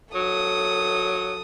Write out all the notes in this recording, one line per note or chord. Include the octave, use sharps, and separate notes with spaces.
F#3 A4 D#6